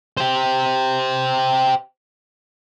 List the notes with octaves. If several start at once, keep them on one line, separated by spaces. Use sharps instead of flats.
G4 C5